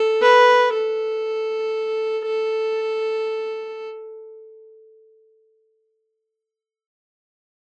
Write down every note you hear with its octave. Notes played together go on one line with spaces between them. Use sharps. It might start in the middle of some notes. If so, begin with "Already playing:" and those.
Already playing: A4
B4
A4
A4